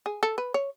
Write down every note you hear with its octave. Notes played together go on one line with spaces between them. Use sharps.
G#4
A4
B4
C#5